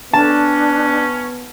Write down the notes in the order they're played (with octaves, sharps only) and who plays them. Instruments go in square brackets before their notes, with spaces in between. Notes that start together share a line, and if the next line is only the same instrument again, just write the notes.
[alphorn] B3 [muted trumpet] C#4 [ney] D4 [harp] A5